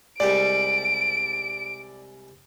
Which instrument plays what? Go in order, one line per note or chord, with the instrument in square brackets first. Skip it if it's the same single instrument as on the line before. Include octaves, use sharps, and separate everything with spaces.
[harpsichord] C2 G3 G#3 [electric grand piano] D5 [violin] D7